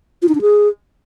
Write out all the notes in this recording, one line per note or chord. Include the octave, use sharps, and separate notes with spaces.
F4
D#4
D4
G#4